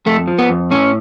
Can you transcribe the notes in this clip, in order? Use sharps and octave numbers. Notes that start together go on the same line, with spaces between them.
F2 A3
F3
B3
F2
A2 C#4